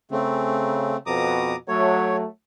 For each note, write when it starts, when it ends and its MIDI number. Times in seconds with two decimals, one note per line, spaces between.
0.11 0.96 49
0.11 0.97 57
0.11 0.97 60
1.06 1.53 41
1.06 1.53 47
1.06 1.56 82
1.06 1.56 86
1.06 1.56 87
1.68 2.24 54
1.68 2.24 57
1.68 2.16 73